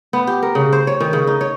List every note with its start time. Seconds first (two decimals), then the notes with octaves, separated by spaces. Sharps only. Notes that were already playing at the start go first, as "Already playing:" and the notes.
0.13 B3
0.27 G4
0.43 A#4
0.55 C#3
0.73 C5
0.87 C#5
1.00 D#3
1.13 C#3
1.27 D#4
1.41 C#5